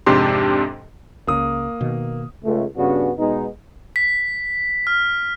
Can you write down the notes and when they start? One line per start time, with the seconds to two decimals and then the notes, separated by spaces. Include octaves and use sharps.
0.06 F2 G#2 C3 D4 G4 C6
1.27 C#2 C#3 A#3 D#6
1.81 B2 D#3
2.44 C#2 A3
2.77 G2 C#3 B3 C#4 D4 F#4
3.18 B2 G#3 B3 D#4
3.96 B6
4.87 F6